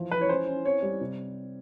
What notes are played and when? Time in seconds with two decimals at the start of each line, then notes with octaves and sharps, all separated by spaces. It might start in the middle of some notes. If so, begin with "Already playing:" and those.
Already playing: E3 F3
0.11 F3 B4
0.21 C#5
0.29 C#4 C5
0.47 C#4
0.65 C4 C#5
0.83 G3
1.01 C3